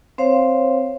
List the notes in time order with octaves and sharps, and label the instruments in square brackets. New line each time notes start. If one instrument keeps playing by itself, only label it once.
[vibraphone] C4 C5 C#5 F5